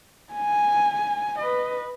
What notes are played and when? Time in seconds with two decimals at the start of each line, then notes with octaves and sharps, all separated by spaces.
0.32 G#5
1.39 B4 D#5